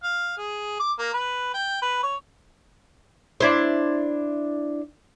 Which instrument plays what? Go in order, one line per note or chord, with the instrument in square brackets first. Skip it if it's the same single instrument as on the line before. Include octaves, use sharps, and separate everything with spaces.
[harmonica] F5
G#4
D6
A#3
B4
G5
B4
C#5
[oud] D4 E4 C5